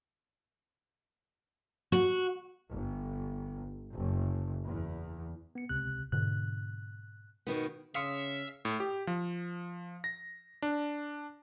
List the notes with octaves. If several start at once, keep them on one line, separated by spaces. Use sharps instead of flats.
F#4
G1
F#1
E2
B3 C#7
C#2 C3 F#6
G#2 B2 D3 F#6
B2 D#3 B3
C#3 E5 F5 C6 D#6 E6 C#7
A2
G4
F3
A#6
D4